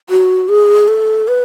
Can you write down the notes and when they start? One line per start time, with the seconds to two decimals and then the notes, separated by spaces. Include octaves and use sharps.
0.10 F#4
0.48 G#4
0.88 A4
1.28 B4